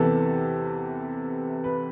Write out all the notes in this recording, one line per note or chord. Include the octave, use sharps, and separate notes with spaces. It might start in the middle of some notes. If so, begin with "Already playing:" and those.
Already playing: E2 C3 E3 A4
B4